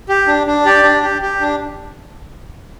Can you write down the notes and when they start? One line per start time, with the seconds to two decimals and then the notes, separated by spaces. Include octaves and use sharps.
0.09 G4
0.27 D4
0.47 D4
0.65 G4 D5
0.84 D4
1.03 G4
1.22 G4
1.41 D4